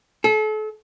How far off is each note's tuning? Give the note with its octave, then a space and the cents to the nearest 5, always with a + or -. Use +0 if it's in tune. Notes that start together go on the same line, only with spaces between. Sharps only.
A4 -35